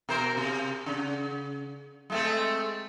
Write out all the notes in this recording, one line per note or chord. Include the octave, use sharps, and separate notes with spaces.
B2 A#4 C5
C3
C#3
G#3 A3 C4